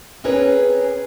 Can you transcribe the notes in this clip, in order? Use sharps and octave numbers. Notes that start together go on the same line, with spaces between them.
C4 C#4 G#4 A#4 B4 C#5